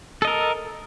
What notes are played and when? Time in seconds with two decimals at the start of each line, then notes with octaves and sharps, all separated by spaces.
0.22 A4
0.25 D#5
0.27 A#4